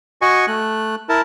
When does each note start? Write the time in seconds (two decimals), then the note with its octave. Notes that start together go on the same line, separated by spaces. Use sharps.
0.22 F#4 D#5 G#5 C#6
0.47 A3 F#6
1.09 E4 A#4 A5